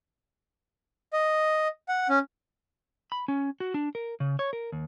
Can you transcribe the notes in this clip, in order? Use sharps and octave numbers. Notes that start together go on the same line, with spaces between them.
D#5
F#5
C#4
B5
C#4
F#4
D4
A#4
C#3
C#5
A#4
D#2